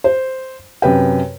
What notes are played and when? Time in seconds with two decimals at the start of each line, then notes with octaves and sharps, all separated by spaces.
0.04 C5
0.82 F#2 C3 B4 G5